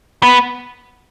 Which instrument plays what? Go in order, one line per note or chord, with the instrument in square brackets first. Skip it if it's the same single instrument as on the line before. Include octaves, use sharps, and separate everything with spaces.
[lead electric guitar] B3